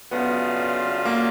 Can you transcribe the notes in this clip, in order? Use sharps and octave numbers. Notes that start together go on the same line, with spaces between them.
C#3 F#3 A3 B3 D4 F4
A#3